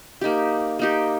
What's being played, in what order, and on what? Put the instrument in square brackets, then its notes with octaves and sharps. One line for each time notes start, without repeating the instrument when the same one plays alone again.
[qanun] A#3 D#4 G4
A#3 D#4 G4